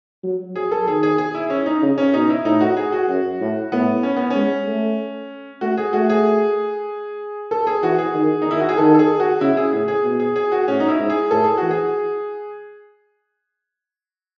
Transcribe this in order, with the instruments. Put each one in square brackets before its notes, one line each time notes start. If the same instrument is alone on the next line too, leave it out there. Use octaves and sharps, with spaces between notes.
[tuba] F#3
[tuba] F#3 [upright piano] G#4
[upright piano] A4
[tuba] D#3 [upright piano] G#4
[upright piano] G#4
G#4
E4
C#4
D#4
[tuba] C#3
[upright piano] C#4
[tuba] B2 [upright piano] D#4
[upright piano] E4
[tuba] A2 [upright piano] D#4
[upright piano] F#4
G#4
F#4
[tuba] F#2
A2
[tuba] A2 [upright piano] B3
[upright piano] C#4
B3
[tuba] G#3 [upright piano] C#4
[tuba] A3
[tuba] A3 [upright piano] F#4
[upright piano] G#4
[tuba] A3 [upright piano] F#4
[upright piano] G#4
A4
G#4
[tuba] E3 [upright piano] F#4
[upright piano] G#4
[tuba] D#3
[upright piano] D#4
[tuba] D#3 [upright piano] E4
[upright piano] F#4
G#4
[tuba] D#3 [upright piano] A4
[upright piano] A4
G#4
F#4
[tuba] C#3 [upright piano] E4
[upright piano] G#4
[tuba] A2 [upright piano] G#4
[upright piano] G#4
[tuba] B2
[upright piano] G#4
G#4
F#4
[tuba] A2 [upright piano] C#4
[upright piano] D#4
E4
[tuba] G#2
[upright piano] G#4
[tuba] A2 [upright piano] A4
[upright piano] G#4
[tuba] E3 [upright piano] F#4
[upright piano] G#4